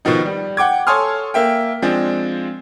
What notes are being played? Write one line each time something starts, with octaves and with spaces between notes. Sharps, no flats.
B2 D#3 F3 D#4
G3
F#5 G5 D6 G#6
A4 C#5 G#5 C6 D#6 F6
A#3 E5 G5
F3 G#3 C4 D4